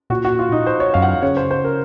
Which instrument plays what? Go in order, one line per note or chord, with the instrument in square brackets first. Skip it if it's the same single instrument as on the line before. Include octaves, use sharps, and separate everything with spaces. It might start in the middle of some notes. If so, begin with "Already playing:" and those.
[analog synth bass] A#2 [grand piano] F#4
[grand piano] F#4
F4
D#4
C5
C#5
[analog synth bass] F#2 [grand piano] F5
[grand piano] F#5
F5
[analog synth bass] C#3 [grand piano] C#5
[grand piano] C5
C5
A#4